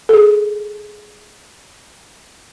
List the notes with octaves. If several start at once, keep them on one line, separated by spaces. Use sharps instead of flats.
G#4 A4